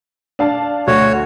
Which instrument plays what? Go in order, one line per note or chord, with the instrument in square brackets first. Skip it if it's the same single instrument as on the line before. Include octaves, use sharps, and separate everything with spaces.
[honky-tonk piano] D4 F5 A5
[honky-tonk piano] D2 [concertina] F#4 C#5